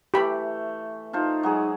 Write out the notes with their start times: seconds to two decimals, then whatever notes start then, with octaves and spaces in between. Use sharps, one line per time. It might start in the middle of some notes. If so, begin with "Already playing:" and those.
0.14 E3 A3 G4 B5
1.13 D#4 F4 A4 C5
1.43 F#3 G#3 G#4